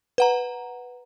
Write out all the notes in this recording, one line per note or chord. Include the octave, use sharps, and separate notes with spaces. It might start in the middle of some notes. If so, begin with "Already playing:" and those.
B4 F#5 A#5